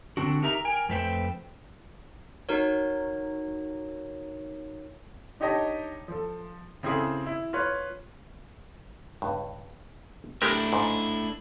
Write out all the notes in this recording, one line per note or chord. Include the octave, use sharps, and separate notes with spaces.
D3 C4 D4 F#4
D#4 G4 A#4 E5 G#5 A#5
A#4 G5 G#5
F2 A3 B4 C5 G5
D#4 F#4 A#4 C#5
D4 D#4 G4 C#5 D#5 A5
F3 A4
C#3 C4 E4 G#4 A4
E4
F4 B4 C#5
C#2 G2
G#3 A3 D4 E4 G4 A#4
G#2